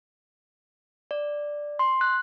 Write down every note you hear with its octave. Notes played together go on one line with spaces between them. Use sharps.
D5
C6
F#6